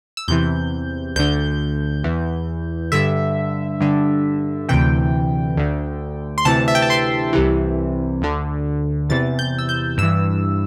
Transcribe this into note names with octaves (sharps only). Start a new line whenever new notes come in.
E6
E2 C3 E3 G6
D2 D3 G6
E2 E3
G2 D3 E5
G2 D3
D2 C3 E3 G5
D2 D3
C6
D2 C3 E3 A5
E5
G5
A5
C6
C2 C3 E3
D2 D3
E2 C3 E3 A6
G6
E6
G6
G2 E3 E6